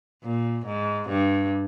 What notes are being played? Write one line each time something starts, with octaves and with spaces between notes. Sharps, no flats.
A#2
G#2
G2